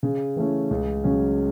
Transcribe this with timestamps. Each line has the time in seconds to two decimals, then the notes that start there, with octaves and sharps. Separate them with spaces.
0.03 C#3
0.36 E3 A3 C#4
0.71 C#2
1.04 C#3 F#3 C#4